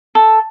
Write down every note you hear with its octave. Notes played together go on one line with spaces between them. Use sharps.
A4